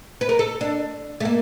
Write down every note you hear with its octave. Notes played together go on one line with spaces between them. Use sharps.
B4
A#4
A4
D4
A3
A#3